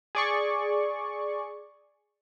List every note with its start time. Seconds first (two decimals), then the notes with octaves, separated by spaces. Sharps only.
0.15 G#4 D5 C#6